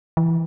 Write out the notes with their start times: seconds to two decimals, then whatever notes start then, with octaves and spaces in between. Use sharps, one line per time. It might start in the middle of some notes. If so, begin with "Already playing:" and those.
0.17 E3